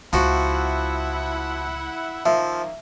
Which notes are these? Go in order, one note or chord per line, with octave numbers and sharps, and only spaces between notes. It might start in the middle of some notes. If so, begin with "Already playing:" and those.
C#2 F3 E4 F#4 E5 F#5
D#3 F3 A#3 E5